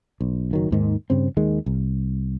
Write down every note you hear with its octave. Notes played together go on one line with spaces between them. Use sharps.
B1
F#1 D#3 F#3
D#2 G#2 D#3
G2 C#3 C4
D#2 D#3 G#3
C2